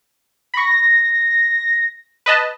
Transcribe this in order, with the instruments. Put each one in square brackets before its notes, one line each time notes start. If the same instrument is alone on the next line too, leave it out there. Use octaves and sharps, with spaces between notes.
[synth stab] B5 C#6 [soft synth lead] A#6
[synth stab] B4 D#5 A5